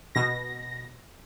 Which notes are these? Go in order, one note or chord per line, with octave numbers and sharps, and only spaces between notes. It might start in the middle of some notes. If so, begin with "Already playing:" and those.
B2 A#6